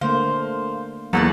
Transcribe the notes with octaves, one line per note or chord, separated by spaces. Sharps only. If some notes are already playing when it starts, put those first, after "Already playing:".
D3 A3 A#3 C5 F5
E2 F#3 A#3 A4 F#5 C#6